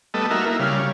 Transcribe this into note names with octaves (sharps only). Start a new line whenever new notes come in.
G3 A3 B3 A4 D#5
A#3 D#4 F#4 A#4 E5
A#3 E4
C#3 G3 F5
C#5